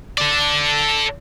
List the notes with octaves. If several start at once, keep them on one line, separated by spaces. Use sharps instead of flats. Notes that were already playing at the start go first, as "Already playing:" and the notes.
A4 D5